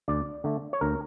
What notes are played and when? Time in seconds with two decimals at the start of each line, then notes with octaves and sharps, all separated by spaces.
0.08 D2 D5
0.44 D3 A3
0.73 C#5
0.81 D2 A#4